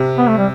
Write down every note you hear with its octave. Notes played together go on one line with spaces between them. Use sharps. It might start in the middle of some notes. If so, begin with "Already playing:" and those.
Already playing: C3
B3
A3
G3